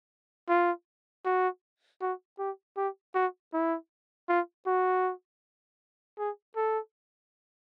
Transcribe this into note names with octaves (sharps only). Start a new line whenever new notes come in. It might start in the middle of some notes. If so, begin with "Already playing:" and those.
F4
F#4
F#4
G4
G4
F#4
E4
F4
F#4
G#4
A4